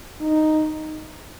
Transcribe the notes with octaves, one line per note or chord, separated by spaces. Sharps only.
D#4